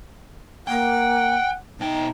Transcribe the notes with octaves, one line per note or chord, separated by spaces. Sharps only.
A#3 F#5 G5
B2 D#4 G5